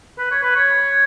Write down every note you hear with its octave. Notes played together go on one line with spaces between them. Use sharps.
B4
C#5
B4
C#5